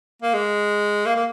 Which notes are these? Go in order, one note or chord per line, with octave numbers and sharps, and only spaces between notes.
A#3
G#3
A#3
A#3